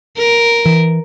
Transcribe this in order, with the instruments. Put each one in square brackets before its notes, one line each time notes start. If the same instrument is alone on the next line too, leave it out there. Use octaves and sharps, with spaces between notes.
[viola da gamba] A#4
[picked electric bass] E3